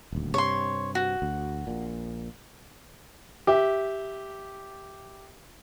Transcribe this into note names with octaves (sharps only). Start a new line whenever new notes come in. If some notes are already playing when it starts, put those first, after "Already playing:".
D#1 D2
G2 C3 C#5 C6
F#4
D2
A#1 A#2
G4 E5